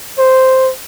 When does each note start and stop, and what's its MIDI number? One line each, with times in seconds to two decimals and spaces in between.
0.18 0.72 72